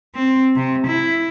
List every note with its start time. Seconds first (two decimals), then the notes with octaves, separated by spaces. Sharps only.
0.15 C4
0.56 C3
0.87 E4